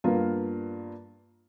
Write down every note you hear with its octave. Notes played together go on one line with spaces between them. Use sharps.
G2 A#3 B3 F4